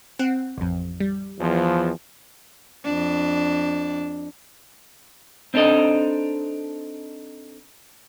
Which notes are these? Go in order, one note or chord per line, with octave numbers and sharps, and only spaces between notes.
C4 F#5
A1 F2
G3
E2 F3
F2 D4
C4 D4 D#4 A4 D#5